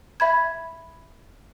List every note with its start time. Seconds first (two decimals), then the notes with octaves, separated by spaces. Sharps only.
0.20 E5 B5 G#6